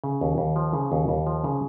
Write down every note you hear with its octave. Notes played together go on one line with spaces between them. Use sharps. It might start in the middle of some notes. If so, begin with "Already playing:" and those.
C#3
D#2
D#2
F3
C#3
D#2
D#2
F3
C#3